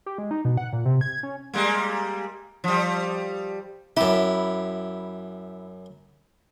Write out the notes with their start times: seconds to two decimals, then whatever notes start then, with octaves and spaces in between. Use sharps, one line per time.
0.06 G4
0.18 G#3
0.31 D#4
0.45 B2
0.57 F#5
0.73 A#2
0.86 C3
1.01 G#6
1.23 C#4
1.54 G3 G#3 A#3
2.64 F3 G3
3.97 F#2 E4 G4